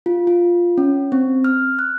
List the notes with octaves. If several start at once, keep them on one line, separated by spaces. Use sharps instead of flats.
F4
F4
C#4
C4
F6
F#6